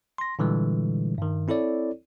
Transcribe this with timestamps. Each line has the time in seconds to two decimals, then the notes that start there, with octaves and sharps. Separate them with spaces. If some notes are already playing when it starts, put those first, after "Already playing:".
0.18 C6 A#6
0.39 A#2 D3 E3 G3 G#3
1.18 G2 D#3
1.48 C4 E4 A4 C#5 D5